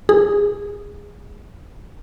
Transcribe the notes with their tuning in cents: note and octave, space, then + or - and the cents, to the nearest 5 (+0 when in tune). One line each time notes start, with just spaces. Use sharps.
G#4 -20